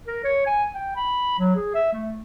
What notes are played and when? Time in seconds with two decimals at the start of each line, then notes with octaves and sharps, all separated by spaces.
0.07 A#4
0.24 C#5
0.47 G#5
0.74 G5
0.96 B5
1.39 F#3
1.56 G#4
1.74 E5
1.93 A3